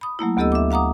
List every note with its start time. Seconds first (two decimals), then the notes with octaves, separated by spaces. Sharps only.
0.01 B5 D#6
0.19 F#3 A3 A#3 E4
0.37 D2 B3 G4 A4 D#5 E6
0.52 E5 D6
0.71 F5 F#5 A#5 D6 D#6